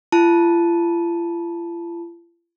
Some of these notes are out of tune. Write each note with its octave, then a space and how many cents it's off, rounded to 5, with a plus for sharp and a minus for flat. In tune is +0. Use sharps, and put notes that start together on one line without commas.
F4 -45 A5 +0